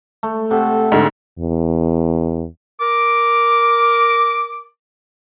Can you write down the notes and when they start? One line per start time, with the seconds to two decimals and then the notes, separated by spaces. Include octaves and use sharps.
0.23 A3
0.51 C3 A4 F#5
0.92 G#2 D3
1.39 E2
2.80 A#4 D6